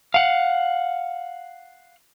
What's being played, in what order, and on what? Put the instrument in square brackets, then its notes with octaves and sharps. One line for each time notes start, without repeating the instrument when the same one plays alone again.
[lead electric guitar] F5 F#5